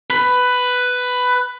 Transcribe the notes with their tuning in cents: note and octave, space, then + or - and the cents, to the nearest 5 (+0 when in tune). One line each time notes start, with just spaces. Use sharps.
B4 +10